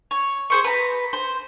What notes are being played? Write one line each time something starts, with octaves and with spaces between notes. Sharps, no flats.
C#5
G#4 C5 C#6
B4 A#5
C5